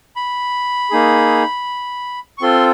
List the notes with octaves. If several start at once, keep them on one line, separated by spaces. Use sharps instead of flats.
B5
A#3 D#4 G#4
C#6
C4 F4 A4 C6